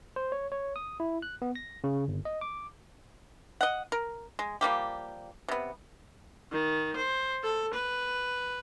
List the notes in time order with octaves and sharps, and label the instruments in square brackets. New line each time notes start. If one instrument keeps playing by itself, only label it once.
[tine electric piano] C5
C#5
C#5
D#6
E4
F#6
B3
A#6
C#3
G1
D#5
D6
[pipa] D#5 F#5
A#4
G#3
F3 G3 A#3 G4
C3 B3
[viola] D#3
C5
A4
B4